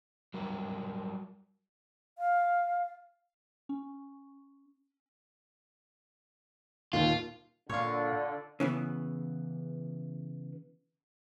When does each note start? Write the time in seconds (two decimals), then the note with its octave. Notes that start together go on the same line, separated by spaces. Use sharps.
0.34 F#3 G3 A#4
2.18 F5
3.69 C#4
6.93 D#1 D#2 F4
7.69 A#2 D3 E4 F4 C#5 F5
8.60 C#3 E3 B3